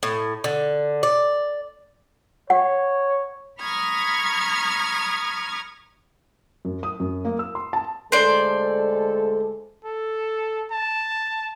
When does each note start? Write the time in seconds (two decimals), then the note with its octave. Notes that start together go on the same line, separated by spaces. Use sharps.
0.03 A2
0.44 D3
1.03 D5
2.50 C#5 F#5
3.61 A#5 B5 C#6 D#6 F6 G#6
6.65 F#2
6.83 D#6
7.00 F#2
7.25 A#3
7.39 E6
7.55 C6
7.73 A5
8.12 D2 G#3 A4 C5 D5
9.85 A4
10.71 A5